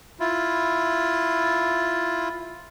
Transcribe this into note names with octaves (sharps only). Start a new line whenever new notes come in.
E4 F4